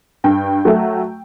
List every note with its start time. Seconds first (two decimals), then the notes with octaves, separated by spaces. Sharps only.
0.24 G2 G5
0.65 F#3 A3